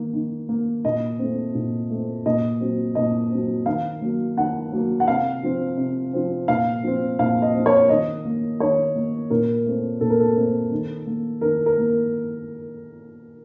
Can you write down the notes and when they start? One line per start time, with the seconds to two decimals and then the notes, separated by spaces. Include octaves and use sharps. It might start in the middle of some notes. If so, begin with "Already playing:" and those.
Already playing: D#3 A#3
0.13 D#3
0.49 A#3
0.85 A#2 D#5
1.19 A3 C4
1.55 A#2
1.90 A3 C4
2.26 A#2 D#5
2.61 F#3 C4
2.95 A#2 D#5
3.31 F#3 C4
3.66 D#3 F5
4.02 F#3 A#3
4.37 D#3 F#5
4.72 F#3 A#3
5.00 F#5
5.07 C3 F5
5.43 F3 C4
5.77 C3
6.13 F3 C4
6.48 A#2 F5
6.83 F3 C4
7.19 A#2 F5
7.42 D#5
7.55 F3 C4
7.66 C#5
7.89 D#3 D#5
8.25 A#3
8.60 D#3 C#5
8.95 A#3
9.30 A#2 A#4
9.66 A3 C4
10.01 A#2 A4
10.10 A#4
10.19 A4
10.36 A3 C4
10.71 D#3
11.07 A#3
11.41 D#3 A#4
11.66 A#4
11.77 A#3